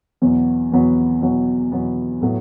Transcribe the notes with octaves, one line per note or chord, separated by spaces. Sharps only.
E2 B2 F#3 B3 F#4
E2 B2 F#3 B3 F#4
E2 B2 F#3 B3 F#4
E2 B2 F#3 B3 F#4
A2 F#3 B3